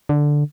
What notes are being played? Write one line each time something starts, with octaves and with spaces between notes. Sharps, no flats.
D3